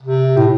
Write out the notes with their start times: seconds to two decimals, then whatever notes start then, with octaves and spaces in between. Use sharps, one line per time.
0.03 C3
0.37 A2